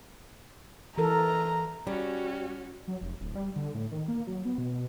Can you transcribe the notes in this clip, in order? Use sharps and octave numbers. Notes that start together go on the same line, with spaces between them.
E3 A4 A#4 A#5
G3 C#4 F#4
F#3
F1
D1
G3
D3
A2
D#3
A#3
F#3
B3
B2